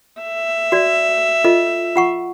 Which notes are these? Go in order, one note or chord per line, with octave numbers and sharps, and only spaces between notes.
E5
F#4 D5
F4 A4 D#5
F4 F#5 C#6